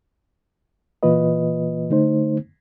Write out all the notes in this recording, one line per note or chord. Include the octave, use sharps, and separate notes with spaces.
A#2 E3 A#3 F4 B4 D#5
D3 A3 D#4 C5